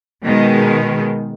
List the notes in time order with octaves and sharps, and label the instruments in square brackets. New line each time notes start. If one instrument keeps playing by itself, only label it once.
[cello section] B2 D#3 G#3